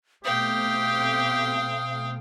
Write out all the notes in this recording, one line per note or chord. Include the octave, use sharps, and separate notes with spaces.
B2 A3 C4 G4 F5 G5 D#6